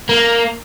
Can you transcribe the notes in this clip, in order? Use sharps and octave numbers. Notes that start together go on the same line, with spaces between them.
A#3